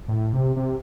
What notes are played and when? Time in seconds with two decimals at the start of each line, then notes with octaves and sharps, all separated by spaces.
0.08 A2
0.33 C3
0.56 C3